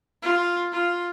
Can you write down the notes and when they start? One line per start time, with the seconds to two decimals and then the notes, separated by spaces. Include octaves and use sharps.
0.22 F4
0.72 F4